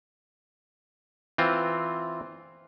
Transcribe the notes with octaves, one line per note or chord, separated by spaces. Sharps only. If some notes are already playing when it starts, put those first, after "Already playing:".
E3 C4 F4